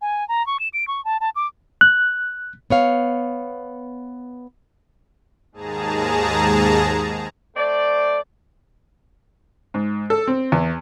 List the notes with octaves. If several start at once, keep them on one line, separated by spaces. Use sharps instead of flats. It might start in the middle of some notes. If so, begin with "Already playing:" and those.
G#5
A#5
C#6
E7
D7
C#6
A5
A5
D6
F#6
B3 C#5 F5
D#2 G#2 G#4 A5 A#5
A3 C4 D5
G#2
A4
C4
E2